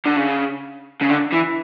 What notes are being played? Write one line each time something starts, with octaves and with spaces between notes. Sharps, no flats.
D3
C#3
C#3
D3
E3